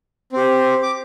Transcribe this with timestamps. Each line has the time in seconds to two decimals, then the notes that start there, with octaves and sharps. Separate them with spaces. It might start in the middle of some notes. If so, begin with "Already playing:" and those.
0.32 C4 G4
0.82 D6